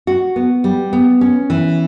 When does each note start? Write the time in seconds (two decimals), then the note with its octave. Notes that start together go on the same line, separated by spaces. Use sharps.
0.07 F#4
0.36 B3
0.64 G3
0.93 B3
1.21 C#4
1.50 E3